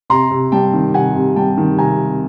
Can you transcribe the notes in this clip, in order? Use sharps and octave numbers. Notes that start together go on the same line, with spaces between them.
C3 A#5 C6
C3
G3 G5 A5
D#3
C3 F#5 G#5
C3
G3 G5 A5
D#3
C3 G#5 A#5